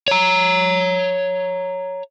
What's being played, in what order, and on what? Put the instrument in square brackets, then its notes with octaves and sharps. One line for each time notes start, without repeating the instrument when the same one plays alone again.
[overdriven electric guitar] C#5 A#5